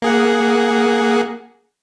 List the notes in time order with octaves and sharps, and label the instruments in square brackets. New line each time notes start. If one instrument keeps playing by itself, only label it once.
[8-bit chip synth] A#3 G#4 F#5